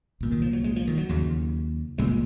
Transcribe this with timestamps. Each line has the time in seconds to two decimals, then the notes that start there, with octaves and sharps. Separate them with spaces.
0.20 C2 A#2
0.31 D#3
0.42 F3
0.53 F#3
0.64 G#3
0.76 F3
0.87 D#3
0.98 F#3
1.09 D#2 C#3
1.98 C2 A#2 G#3